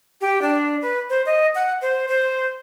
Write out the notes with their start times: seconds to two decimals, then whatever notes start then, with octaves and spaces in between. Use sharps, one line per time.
0.21 G4
0.42 D4
0.82 B4
1.10 C5
1.26 D#5
1.55 F#5
1.82 C5
2.08 C5